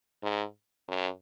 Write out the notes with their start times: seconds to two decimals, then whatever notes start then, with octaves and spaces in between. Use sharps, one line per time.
0.23 G#2
0.88 F#2